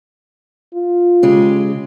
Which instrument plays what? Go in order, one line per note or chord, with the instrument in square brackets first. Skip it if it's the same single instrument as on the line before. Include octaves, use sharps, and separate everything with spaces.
[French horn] F4
[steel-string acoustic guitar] C#3 G#3 G4